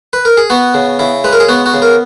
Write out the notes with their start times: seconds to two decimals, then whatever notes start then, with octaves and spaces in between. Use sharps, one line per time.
0.13 B4
0.25 A#4
0.37 G#4
0.50 B3 F#4
0.74 C#3
0.99 C#3 E4
1.24 G#3 B4
1.33 A#4
1.40 G#4
1.49 B3 F#4
1.66 F#4
1.74 C#3
1.82 A#4